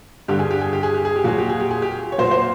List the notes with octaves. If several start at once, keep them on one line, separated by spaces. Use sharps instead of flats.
G2 D3 G3 G4
G#4
G4
G#4
G4
G#4
G4
G#4
G4
A#2 F#3 G#4
G4
G#4
G4
G#4
G4
C#5
A#2 F#3 C5
C5